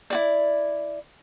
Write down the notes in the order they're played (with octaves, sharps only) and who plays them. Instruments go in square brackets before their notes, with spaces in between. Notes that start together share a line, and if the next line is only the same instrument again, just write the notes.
[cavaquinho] E4 F#4 D5